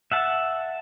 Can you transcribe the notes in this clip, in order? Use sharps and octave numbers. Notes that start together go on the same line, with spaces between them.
E5 F#5 A5